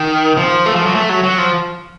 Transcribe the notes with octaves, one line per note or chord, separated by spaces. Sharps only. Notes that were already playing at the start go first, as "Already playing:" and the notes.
Already playing: D#3
F3
A3
F3
F#3
A3
F#3
F#3
F3